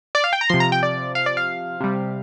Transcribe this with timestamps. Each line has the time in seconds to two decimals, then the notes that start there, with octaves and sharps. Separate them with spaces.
0.15 D5
0.24 F5
0.33 G5
0.41 A#5
0.49 C3 F3 C6
0.60 A#5
0.72 G5
0.83 D5
1.15 F5
1.26 D5
1.37 F5
1.80 C3 G3